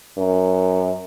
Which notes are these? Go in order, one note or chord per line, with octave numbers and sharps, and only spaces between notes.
F#2